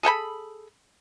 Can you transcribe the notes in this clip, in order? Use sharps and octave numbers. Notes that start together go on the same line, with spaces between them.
G#4 A4 G5 B5